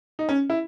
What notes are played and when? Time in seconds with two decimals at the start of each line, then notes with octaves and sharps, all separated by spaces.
0.19 D#4
0.29 C#4
0.50 E4